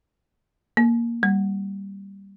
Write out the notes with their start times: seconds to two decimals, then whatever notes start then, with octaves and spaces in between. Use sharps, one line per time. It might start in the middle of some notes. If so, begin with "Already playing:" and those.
0.77 A#3
1.23 G3